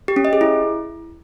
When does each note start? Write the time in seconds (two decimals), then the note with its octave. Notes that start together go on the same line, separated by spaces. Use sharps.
0.08 G4
0.16 C#4
0.25 D#5
0.33 G#4
0.41 E4